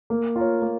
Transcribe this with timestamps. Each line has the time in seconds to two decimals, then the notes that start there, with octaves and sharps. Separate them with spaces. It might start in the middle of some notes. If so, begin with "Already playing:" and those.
0.10 A#3
0.36 F4 A#4 C#5
0.62 A#3